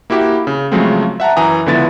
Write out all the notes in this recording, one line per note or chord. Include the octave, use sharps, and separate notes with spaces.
A#3 E4 F#4 G4
C#3
C#3 F3 F#3 G#3 A3 C4
E5 F#5 A5 A#5
F#2 E3 G#5 A#5 D#6
C#2 D3 F3 B3 E4 A6